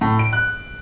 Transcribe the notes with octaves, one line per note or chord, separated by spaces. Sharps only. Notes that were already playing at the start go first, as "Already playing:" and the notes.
A2
D7
F#6